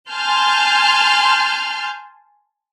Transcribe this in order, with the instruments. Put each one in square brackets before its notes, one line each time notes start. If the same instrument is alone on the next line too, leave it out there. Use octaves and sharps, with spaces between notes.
[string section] G#5 A5 C6 F6 G6